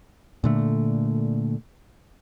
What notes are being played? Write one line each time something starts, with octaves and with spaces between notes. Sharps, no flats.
A#2 D3 A3